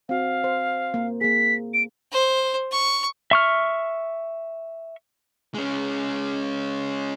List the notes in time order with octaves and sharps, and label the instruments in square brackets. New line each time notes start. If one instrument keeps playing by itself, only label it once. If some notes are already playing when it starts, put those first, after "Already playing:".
[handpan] C4 F#4 [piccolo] F5
[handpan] C5
A#3
[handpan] A#3 G#4 [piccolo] B6
[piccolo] D7
[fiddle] C5
C#6
[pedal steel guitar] E5 C#6 F6
[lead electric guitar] G#3 C#4